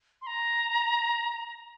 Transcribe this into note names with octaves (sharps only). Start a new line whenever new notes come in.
C6
A#5